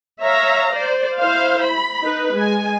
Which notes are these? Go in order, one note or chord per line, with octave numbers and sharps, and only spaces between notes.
C#5 E5 F5 A#5
C5 D5
E4 C5 F5
B5
D#4 B4
G#3 G#5